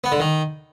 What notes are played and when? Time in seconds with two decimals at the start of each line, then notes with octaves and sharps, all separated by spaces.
0.04 B3
0.12 D3
0.20 D#3